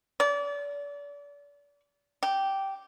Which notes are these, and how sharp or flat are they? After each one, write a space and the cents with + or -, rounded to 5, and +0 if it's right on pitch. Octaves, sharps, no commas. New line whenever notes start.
D5 -35
G4 -10